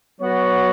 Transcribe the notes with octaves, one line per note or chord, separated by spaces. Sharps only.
F#3 B3 F#4 C#5